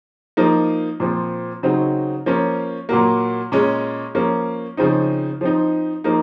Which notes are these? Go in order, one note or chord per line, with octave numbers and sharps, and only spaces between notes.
F3 A#3 D#4
A#2 F3 C4
C#3 F#3 C4 D#4
F3 A#3 C#4
A#2 F#3 A#3
A#2 G#3 C#4
F3 A#3 C#4
C#3 F3 C4 D#4
F3 C4 D#4
F3 A#3 D#4